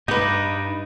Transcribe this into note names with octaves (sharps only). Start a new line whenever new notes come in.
G2 D#4 G4 B4